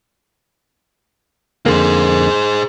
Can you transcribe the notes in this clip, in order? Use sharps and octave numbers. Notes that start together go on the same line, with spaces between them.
F2 D3 A#3 G#4 C5